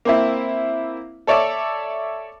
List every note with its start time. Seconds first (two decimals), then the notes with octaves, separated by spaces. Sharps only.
0.05 A#3 C4 E4
1.27 A4 C#5 D5 E5 A5